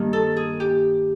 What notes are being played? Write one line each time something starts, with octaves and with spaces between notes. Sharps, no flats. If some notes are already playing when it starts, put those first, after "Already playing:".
Already playing: G2 D#3 G3 A#3
A4
G#4
G4